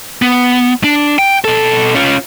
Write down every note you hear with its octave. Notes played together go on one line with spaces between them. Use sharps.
B3
D4
G5
B2 A4
C#4 F4